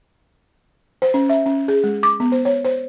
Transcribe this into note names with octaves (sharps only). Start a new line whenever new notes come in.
C5
C#4
E5
C#4
G#4
G#3
D6
B3
C5
C#5
C5